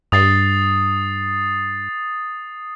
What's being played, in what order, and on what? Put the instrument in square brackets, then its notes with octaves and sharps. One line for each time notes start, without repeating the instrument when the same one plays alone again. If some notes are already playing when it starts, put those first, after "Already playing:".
[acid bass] G2 [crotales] D#6 A6 C7